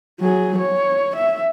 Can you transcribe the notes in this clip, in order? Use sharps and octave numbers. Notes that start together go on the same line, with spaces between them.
F#3 G#4
C#5
E5